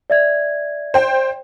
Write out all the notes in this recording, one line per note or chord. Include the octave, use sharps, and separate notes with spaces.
D5 E5 G#6
C5 G5